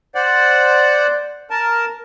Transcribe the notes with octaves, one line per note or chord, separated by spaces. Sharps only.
C5 D5 F#5
A#4 A5